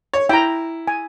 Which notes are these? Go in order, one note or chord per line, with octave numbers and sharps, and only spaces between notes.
C#5
E4 G5 A#5
G#5